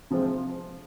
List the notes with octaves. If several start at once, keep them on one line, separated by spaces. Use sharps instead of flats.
C3 F3 G#3 C4 F4